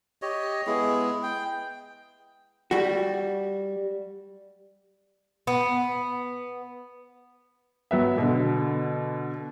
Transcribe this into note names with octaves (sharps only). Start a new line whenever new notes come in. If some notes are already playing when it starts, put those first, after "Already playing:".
G4 C#5 D#5
G#3 B3 E4 G#4
G5
G3 F#4
B3
F#3 B3 E5
B2 D3